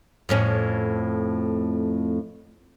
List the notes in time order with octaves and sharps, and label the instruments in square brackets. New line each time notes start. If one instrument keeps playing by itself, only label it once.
[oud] F2 A2 C#4